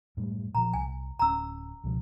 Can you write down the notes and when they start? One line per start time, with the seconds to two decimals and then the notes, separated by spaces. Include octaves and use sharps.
0.17 F#2 A2 G3
0.55 A#2 F3 A#5
0.74 C2 G#5
1.19 D1 C#4 A#5 E6
1.84 C#2 B2 F3